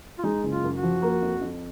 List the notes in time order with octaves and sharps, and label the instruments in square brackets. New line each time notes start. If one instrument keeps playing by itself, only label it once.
[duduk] F4
[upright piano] G#3 [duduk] D#4
[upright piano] F#1
[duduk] F4
[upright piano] F#2
[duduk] F#4
[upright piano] F3
A#3
F2
F2